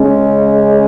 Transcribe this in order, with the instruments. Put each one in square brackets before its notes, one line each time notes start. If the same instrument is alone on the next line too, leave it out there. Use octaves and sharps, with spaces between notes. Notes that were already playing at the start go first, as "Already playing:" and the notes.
Already playing: [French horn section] C#3 G#3 C#4